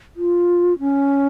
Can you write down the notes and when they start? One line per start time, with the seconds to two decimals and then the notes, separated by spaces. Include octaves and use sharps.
0.16 F4
0.79 C#4